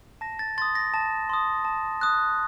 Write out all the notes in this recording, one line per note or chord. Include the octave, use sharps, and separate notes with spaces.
A5 A#6
A6
C6 D#6 A6
A#6
A5
C6 D#6
A5
D#6 F#6